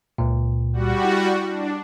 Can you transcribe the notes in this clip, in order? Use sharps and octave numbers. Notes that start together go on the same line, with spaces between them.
C#2 A#2
G3 F#4
E4
D4